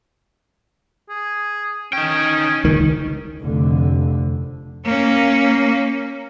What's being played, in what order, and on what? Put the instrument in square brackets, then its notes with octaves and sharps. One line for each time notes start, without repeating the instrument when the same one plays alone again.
[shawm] G#4
[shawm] C#4 [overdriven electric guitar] D#4 G5
[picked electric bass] C#2 D#3
[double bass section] F1 F2 D3
[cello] A#3 C#4